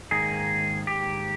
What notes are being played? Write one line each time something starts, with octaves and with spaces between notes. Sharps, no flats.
G#2 D#3 A#3 G#4
G4